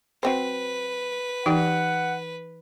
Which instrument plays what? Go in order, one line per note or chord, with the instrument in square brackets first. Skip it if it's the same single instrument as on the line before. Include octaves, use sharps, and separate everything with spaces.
[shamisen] F#3 C4 C5 [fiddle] B4
[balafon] E3 D#4 [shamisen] G4 [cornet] F#5